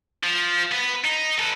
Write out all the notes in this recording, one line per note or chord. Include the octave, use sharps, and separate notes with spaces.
F3
B3
D#4
A4 B4